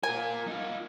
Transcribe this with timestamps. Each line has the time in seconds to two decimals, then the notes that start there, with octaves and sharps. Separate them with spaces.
0.03 F4 A#4 G#5
0.47 D#4 F4